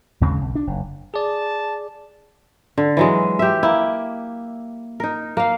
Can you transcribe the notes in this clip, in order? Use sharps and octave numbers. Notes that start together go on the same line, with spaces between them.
D#2 C#3 G#3 C4
B1
D4
F#1
G#4 D5 A5
D3
E3 F#3 G#3
G4 E5
A#3 E4
D#4 A#4
A#3 F5